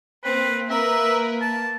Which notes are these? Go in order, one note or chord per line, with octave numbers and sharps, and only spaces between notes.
A#3 C4 B4
A#4 B4 E5
A5